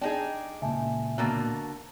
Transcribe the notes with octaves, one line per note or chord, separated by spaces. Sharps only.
D4 D#4 G#4 G5
C#2 A#2 E5 G#5 A5
B2 D3 A#3 A#5 A6